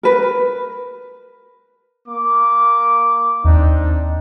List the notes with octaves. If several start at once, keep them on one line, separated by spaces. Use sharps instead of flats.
A#4 B4
A#3 D6
D#2 C4 D4 D#4